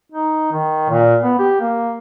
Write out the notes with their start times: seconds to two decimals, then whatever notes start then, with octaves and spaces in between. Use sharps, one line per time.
0.12 D#4
0.53 D#3
0.89 A#2
1.23 B3
1.39 G4
1.61 A#3